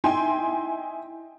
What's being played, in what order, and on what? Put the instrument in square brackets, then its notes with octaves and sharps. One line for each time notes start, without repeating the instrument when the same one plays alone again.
[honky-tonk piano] D#4 E4 G5 G#5 C6